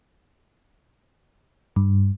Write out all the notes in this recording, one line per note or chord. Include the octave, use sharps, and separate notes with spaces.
G2